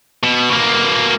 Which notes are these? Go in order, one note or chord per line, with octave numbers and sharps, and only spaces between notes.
B2
B2 A#3